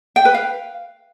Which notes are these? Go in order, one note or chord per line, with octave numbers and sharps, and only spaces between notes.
G5
B4
F5